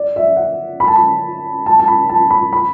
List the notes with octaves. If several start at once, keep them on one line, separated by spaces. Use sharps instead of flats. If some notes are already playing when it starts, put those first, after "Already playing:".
Already playing: D5
E5
F#5
B5
A5
B5
A5
A5
B5
A5
B5
B5